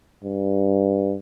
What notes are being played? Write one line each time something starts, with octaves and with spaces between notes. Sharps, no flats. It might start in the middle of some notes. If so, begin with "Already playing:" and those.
G2